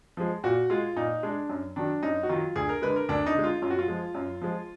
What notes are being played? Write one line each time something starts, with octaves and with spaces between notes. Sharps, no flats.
F3 G#3
A#2 F#4
G#3 F4
A#2 D#4
G#3 D4
F#2
D#3 F#3 D4
F#2 D#4
F#4
D#3 F#3 F4
D2 G#4
A#4
D3 G#3 B4
A#4
D2 D4
D#4
D3 G#3
F4
F#2 F4
F#4
F4
F3 G#3
F#2
F3 G#3